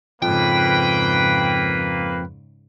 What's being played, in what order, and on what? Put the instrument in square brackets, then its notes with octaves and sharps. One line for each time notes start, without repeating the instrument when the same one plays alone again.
[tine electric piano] F2 F3 [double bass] G#2 C#3 [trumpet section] A#3 B4 [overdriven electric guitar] G5